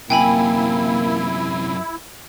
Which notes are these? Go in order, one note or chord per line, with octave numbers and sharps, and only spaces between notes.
F#2 C3 A#3 E4 G5 G#5 B5